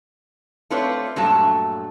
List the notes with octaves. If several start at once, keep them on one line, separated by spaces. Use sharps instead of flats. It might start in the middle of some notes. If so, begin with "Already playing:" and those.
A3 C4 F4 B4 C#5 D5
G2 A#2 F#3 A3 D4 A5